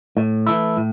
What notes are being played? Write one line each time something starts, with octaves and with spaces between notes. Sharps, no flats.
A2
E3 A3 E4
A2